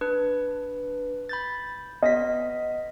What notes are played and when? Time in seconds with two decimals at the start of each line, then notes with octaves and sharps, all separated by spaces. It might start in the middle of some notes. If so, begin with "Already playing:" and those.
0.01 D4 B4
1.29 B5 G6 A6
2.02 B3 D#5 A#6 B6